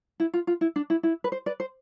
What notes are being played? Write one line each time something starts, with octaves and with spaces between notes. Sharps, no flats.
E4
F4
F4
E4
D4
E4
E4
B4
C5
B4 D5
C5